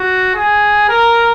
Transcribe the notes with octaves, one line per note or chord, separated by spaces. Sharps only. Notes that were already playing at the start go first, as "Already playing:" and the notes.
Already playing: F#4
G#4
A#4